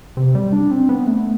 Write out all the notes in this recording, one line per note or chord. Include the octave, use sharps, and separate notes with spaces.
C3
G3
D4
C4
B3
A3